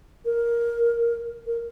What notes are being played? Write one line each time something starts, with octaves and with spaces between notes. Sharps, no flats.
A#4
A#4